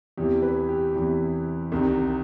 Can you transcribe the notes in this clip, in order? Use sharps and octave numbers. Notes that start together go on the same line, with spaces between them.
E2 C3 E3 G4
B4
G4
E2 C3 E3
C2 C3 D#3